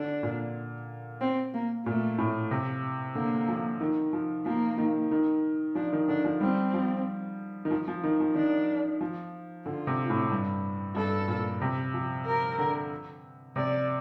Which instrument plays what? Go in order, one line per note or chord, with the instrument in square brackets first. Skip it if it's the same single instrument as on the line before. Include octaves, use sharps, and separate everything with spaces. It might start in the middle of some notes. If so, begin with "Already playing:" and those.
Already playing: [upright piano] D3 [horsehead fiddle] D4
[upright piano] A#2
[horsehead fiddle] C4
A#3
[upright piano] A#2 [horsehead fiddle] A3
[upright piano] A2
C3
[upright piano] D3 [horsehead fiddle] A#3
[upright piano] F3
D#3
F3
[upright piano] F3 [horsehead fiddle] A#3
[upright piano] D#3
D#3
[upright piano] F3 [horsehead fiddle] D4
[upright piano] D#3
[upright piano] D3 [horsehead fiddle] D4
[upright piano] F3
[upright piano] G3 [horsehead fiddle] C4
[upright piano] F3
D#3
F3
F3
D#3
F3
[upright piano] D#3 [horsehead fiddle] D4
[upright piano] F3
[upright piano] D3 [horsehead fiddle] F4
[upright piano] C3
A2
G2
[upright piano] G2 [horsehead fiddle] A4
[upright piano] A#2
C3
F3
[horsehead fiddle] A#4
[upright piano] D3
[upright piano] C3 [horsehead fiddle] D5